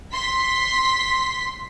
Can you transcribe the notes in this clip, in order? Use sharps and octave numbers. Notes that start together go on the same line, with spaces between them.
C6 B6